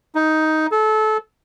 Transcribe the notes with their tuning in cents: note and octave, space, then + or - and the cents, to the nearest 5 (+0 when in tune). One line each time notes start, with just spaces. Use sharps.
D#4 +10
A4 -25